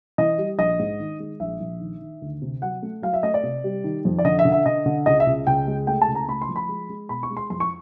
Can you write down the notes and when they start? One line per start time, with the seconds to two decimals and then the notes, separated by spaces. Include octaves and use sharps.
0.18 E3 D#5
0.38 G3
0.58 A#1 D#5
0.79 G#2
1.00 D#3
1.20 G#3
1.40 A#1 E5
1.60 A#1
1.80 D#3
2.01 D#3
2.22 D2
2.42 C3
2.62 F#3 F#5
2.82 A3
3.02 F#3 F5
3.13 E5
3.23 A3 D#5
3.34 D5
3.43 C3
3.64 G3
3.84 D#3
4.05 F2
4.19 D5
4.25 D3 D#5
4.39 E5
4.45 D3
4.52 E5
4.66 D3 D#5
4.86 D3
5.06 C#2 D#5
5.20 E5
5.27 C#2
5.47 C#2 G5
5.67 G#3
5.87 A3 G5
6.02 A5
6.08 C#2
6.15 A#5
6.28 A3 B5
6.42 C6
6.49 F3
6.56 B5
6.69 G#3
6.89 G#3
7.09 B2 B5
7.23 C#6
7.30 G#3
7.37 C6
7.50 F2 C6
7.60 C#6